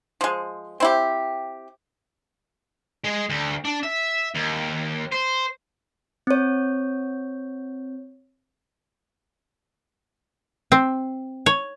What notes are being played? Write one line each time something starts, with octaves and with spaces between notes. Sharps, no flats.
F3 G#3
C4 E4 G4
G#3
D2
D4
E5
D#2
C5
C4 C#5
C4
C#5